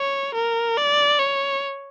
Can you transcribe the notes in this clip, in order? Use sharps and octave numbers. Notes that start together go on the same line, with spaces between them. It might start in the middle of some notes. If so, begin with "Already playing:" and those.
Already playing: C#5
A#4
D5
C#5